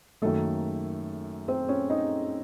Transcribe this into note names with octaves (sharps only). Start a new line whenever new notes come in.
F#2 D#3 A3 A#3 A4
C4 C5
C#4 C#5
D#4 D#5